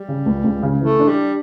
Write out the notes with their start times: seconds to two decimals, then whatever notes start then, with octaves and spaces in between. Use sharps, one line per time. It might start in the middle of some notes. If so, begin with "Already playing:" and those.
Already playing: G3
0.08 C#3
0.26 C#2
0.44 C#2
0.62 C#3
0.81 E3 A3
0.99 D4
1.09 G3